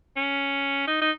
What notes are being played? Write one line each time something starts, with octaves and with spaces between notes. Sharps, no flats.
C#4
D#4
D#4